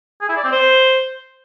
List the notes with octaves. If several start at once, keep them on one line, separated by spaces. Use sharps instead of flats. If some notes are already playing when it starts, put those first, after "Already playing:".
G#4
E4
D5
C4
C5